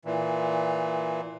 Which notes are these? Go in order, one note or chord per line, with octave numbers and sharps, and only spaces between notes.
A#2 E3